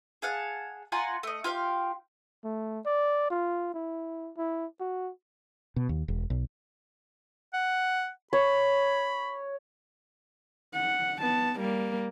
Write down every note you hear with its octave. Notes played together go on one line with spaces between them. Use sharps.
G#4 F5 F#5 A5
F4 F#5 G#5 A#5
A3 D#5
F4 G4 F5 G5
A3
D5
F4
E4
E4
F#4
B2
D#2
E1
B1
F#5
C#5 B5
F#5
B3 A5
G3 A#3